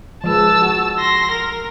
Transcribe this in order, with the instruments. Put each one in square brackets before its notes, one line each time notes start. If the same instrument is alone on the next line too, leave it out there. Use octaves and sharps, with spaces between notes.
[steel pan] F3 G#3 B4 [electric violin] A5 E6
[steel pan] F#4
[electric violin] C6 A#6
A#4